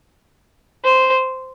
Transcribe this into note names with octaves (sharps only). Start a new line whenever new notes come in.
C5